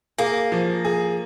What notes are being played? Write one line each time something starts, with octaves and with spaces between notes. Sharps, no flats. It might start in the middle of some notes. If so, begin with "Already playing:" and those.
A#3 G#4
F3
G#4